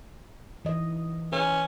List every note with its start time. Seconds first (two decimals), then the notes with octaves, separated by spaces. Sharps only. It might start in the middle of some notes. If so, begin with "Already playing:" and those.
0.65 E3 D#5
1.32 C#4 B4